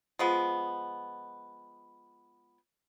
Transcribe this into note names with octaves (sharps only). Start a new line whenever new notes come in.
F3 G#3 B3